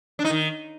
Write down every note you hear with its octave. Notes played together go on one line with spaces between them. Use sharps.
D4
D#4
D#3